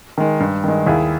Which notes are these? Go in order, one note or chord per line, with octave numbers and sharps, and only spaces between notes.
D#3 G#3
G2
D#3 G#3
D#2 E4 G#4